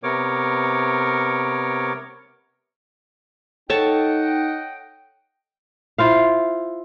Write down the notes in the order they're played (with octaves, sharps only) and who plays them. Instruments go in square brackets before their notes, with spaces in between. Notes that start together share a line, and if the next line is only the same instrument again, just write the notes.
[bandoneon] C3 B3 A#4 C#5 D6
[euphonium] D#4 [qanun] A4 C#5 A5 [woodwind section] D#5 F#5 G5
[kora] E4 F4 C5 F5